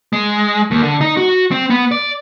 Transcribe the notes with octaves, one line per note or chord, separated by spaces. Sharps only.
G#3
D#2
D3
D#4
F#4
C4
B3
D5